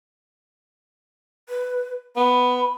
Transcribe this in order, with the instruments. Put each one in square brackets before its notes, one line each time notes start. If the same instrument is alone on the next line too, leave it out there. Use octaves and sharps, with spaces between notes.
[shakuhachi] B4
[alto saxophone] B3 [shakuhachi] B5